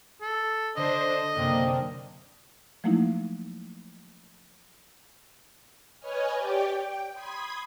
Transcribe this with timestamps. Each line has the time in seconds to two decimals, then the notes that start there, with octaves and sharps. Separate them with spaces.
0.21 A4
0.77 D3 D4 C5 D#5
1.35 F#2 C3 A#3 C4 D4
2.84 F3 F#3 A3 A#3 D#4 E4
6.00 B4 C#5 D#5 G#5 F6
6.35 G4 C#5 D5 G5 D6
6.69 G5
7.14 B5 C6 D#6 G#6